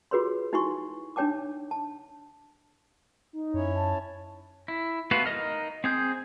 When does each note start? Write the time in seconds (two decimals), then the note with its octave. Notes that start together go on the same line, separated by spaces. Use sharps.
0.11 F4 F#4 G#4 B4 C#5 C6
0.53 D#4 E4 F#4 G#5 C6 C#6
1.16 D4 D#4 C#5 G5 A5 D6
1.71 A5
3.33 D#4
3.54 F#2 C#4 E4 C#5
3.75 A5
4.68 E4
5.11 A3 B3 F4 F#4 B4
5.26 D#4 A#4 D#5 F6
5.84 C4 G#4 G6